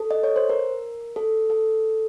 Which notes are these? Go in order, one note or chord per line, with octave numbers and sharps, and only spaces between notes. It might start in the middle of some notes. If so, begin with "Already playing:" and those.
Already playing: A4
D#5
C#5
C5
A#4
A4
A4